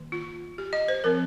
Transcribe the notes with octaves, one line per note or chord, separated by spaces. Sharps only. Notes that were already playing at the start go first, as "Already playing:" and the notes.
Already playing: D#3 A#3
F4
G4
D#5
C5
F3 C4 A#4